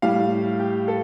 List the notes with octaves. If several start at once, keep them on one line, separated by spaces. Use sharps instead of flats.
A2 G3 F5
G4
A4